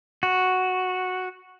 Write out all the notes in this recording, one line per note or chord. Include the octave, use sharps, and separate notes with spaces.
F#4